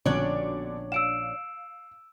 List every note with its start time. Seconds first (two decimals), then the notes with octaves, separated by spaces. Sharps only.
0.06 A#1 B2 D3 C#4 D4 C#5 D5
0.92 F5 E6 D7 E7